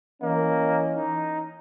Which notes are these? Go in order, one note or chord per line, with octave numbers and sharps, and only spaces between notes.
E3 A#3 C#4 D#5
D#4